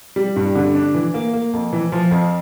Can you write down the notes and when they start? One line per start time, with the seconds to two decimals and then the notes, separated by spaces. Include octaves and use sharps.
0.16 G3
0.36 G2
0.55 D3
0.75 D4
0.94 E3
1.14 A#3
1.33 A#3
1.53 F2
1.73 E3
1.92 F3
2.11 F2